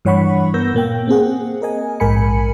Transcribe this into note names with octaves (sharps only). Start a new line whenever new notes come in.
G2 E3 C#5 F#5 B5 C#6
B3 A#4 E6 G6 A#6
A#2 A#3 G5
A#3 C4 G#4 F#5
A#4 D#5 G#5
A#1 G#2 A#4 G#5 B5 C#7